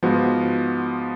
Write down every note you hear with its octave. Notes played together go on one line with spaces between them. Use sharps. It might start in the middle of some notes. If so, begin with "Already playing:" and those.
G#2 F3 B3 F#4